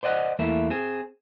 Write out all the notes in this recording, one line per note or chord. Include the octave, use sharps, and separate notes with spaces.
C5 D5 D#5 F#5
E2 E3 A3 A#3 E4
C4 G#4